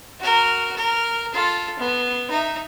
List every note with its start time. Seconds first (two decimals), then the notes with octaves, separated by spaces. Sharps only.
0.20 F#4 A#4
0.76 A#4
1.33 F4 A4
1.79 B3
2.30 D#4 E5